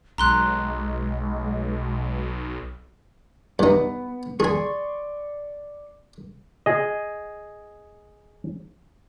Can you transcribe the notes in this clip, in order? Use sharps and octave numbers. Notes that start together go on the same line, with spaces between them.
B1 G#3 A#5 C6 F#6
G2 B3 D#4
G#4 D5 G#5 C6 C#6
G#4 D#5